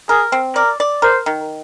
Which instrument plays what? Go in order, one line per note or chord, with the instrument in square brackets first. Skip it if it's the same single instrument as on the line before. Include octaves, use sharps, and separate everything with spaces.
[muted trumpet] G#4 [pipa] A#4
[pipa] C4
[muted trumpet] A#4 [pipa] D5
[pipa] D5
[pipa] A#4 [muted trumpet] C5
[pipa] D#3